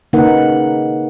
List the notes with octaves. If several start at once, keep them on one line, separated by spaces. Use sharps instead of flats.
C#3 A#3 D#4 A#4 B4 F#5